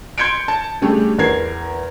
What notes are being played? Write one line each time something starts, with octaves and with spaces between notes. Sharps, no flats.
C6 G6 G#6 C#7 D7
A5
C#3 G3 A3 D4 G4 G#4
E2 A#4 G#6 C7